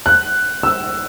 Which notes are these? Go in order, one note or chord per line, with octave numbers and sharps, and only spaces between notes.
F#6
E6